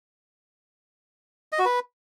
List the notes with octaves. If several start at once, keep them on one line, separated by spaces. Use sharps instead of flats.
D#5
F#4
B4